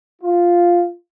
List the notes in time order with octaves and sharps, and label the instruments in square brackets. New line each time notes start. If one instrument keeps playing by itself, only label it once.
[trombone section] F4